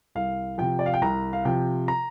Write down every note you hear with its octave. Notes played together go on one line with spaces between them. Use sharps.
C2 F5
C3 F3 G5
D5
F5
G5
C2 A#5
F5
C3 F3 G5
A#5